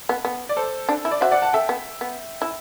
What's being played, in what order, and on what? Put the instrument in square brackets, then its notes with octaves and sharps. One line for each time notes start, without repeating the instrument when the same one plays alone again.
[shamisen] B3
B3
[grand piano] D5
A4 C5
[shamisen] D4
E4
[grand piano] D5
[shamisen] F#4 [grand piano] C5 E5
[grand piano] D5 F#5
F#5 A5
[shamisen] A4 [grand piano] E5 G5
[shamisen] B3
B3
E4